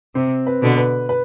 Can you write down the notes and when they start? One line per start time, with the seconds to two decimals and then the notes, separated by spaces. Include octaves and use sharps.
0.15 C3 C4
0.47 B4
0.62 B2 D3
0.78 B4
1.09 B4